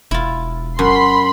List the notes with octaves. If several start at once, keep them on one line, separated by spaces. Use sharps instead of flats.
E1 E4 F4
F#2 B5 C6